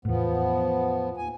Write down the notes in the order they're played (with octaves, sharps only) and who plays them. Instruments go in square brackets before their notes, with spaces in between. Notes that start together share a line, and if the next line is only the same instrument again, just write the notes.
[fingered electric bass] E2 A2 [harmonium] F3 B3
[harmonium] D#2 G#5